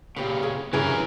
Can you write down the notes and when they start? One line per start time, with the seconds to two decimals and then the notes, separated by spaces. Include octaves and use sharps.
0.17 A#2 C#3 G4 B4
0.43 G#4
0.73 F1 G2 C#3 E3 F#3 C#4 G#4 A#4